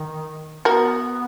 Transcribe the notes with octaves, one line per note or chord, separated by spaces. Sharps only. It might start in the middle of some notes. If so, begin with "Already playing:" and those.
Already playing: D#3
B3 F#4 A#4